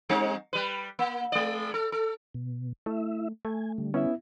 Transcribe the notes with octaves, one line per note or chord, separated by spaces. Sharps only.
G3 C4 D#4
G3 B4
A#3
G#3 D5
A4
A4
B2
A3 E4 E5
A3 G#5
D3 G3
B3 C#4 E4 E5